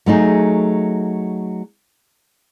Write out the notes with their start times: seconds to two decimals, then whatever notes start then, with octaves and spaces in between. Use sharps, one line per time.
0.06 F#3 A3 D#4 G#4